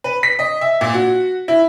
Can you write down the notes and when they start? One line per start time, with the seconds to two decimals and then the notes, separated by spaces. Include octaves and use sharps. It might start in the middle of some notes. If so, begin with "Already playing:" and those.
0.04 B4
0.23 B6
0.39 D#5
0.61 E5
0.81 A#2
0.94 F#4
1.48 E4